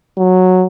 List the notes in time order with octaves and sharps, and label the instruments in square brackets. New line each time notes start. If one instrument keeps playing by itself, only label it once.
[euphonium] F#3